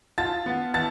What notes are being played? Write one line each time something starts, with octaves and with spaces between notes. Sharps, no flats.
F4 A5 A6
B3
E3 A5 A6